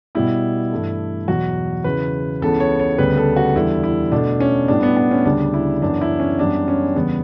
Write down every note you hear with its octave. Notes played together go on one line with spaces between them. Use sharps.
B2 G3 B3 E4
G2 E3 A3
E2 B2 F#3 F#4
E2 C#3 E3 B4
C#2 C#3 E3 B3 A4
C#5
C#5
D2 C#3 G3 B3 B4
A4
F#4
E2 D3 G3 E4
E4
B2 A3 D4
C#4
A2 G3 B3 D4
B3
B3
C#4
D2 C#3 G3 D4
E4
F#2 C#3 E3 B3 D4
E4
C#4
F#2 E3 G3 B3 D4
C#4
E2 C#3 G3 B3